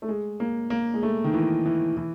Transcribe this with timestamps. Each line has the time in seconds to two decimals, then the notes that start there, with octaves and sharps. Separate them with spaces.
0.02 A3
0.08 G#3
0.40 A#3
0.70 A#3
0.94 G#3
1.03 A3
1.24 D#3
1.34 E3
1.65 E3
1.97 E3